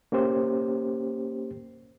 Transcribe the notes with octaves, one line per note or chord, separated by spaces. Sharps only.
A#3 C#4 G4 C5